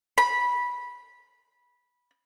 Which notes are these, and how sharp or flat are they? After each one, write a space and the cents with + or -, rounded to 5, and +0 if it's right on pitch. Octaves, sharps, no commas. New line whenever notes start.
B5 -15